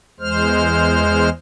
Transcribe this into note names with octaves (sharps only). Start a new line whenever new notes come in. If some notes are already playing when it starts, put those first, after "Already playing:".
E2 G#3 C5 F6